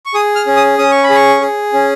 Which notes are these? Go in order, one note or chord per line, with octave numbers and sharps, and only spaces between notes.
C#6
G#4 D#6
F6
C#4
D#6
C#4 D#6
C#6
B5
G#4
C#6
G#4
C#4